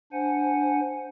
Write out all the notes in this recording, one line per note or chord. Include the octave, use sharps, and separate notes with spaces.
D4 C5 F#5 G#5